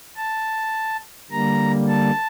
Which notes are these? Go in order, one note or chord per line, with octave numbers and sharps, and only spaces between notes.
A5
D3 G3 A#3 A#5
A5